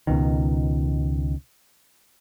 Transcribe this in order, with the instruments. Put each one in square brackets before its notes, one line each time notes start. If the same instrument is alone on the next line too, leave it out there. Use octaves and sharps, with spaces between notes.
[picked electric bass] C#2 B2 D#3